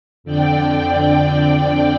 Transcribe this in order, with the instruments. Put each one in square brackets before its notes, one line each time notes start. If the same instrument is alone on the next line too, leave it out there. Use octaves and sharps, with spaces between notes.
[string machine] F2 D3 D5 G5